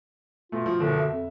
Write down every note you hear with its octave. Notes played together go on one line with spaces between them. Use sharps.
B2 A3 F4
F3
F#1 B2 D3
E5
F2